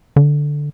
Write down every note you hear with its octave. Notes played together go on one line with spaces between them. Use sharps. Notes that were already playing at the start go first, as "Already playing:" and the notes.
D3